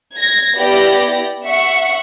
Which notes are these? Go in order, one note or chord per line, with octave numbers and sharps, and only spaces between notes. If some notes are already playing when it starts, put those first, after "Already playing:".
G#6 A#6
B3 E4 G4 D5 A#6
E5 F#5 C#6